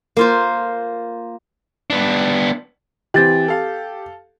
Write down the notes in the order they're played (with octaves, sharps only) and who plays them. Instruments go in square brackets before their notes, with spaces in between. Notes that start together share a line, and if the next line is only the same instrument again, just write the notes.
[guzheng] A#3 F4 C5
[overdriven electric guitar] B3 D4
[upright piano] E3 C4 [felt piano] G4 [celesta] G5 A6
[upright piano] A4 F5